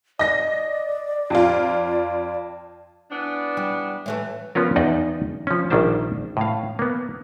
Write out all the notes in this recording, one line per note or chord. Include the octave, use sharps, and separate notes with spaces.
D5 D#5 A#6
F2 F4
E3 B3 D4
G3
A2 E3 A3
F3 B3 C#4 F4 A#4
E2 D#4 D5 F#5 G5
F3 C#4
A#1 D#3 G3 D4 C5 A5
A2 F5
A#3 B3